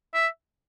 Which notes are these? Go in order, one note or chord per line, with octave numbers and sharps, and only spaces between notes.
E5